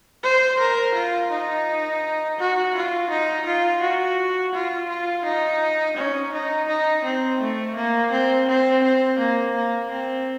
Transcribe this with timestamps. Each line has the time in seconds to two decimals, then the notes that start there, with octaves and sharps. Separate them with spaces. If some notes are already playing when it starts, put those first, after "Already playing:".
0.23 C5
0.59 A#4
0.95 F4
1.31 D#4
2.39 F#4
2.75 F4
3.10 D#4
3.46 F4
3.81 F#4
4.53 F4
4.89 F4
5.25 D#4
5.97 C#4
6.33 D#4
6.68 D#4
7.04 C4
7.40 A3
7.76 A#3
8.12 C4
8.48 C4
8.84 C4
9.19 A#3
9.55 A#3
9.91 C4